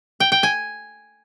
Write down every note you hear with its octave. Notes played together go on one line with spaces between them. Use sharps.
G5
G5
G#5